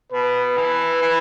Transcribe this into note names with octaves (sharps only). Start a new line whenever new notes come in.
B2 B4
E3
E3